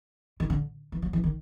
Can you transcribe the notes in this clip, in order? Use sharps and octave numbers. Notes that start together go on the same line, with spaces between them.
D#3
D3
E3
F#3
E3
D#3